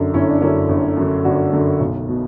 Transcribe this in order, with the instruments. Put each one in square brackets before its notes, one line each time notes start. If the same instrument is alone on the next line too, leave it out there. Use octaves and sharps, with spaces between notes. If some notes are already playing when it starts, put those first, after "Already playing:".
Already playing: [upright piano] G1 F#2 D3 D4
G1 C#4 E4
D4
F#2 D3 C#4 E4
G1
F#2 D3
G1 D4 F#4
F#2 D3
B1
B2